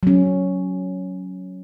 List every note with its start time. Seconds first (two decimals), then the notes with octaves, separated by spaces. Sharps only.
0.03 F#3 C#4